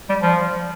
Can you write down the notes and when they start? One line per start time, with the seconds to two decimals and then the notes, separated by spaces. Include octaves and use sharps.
0.09 G3
0.22 F3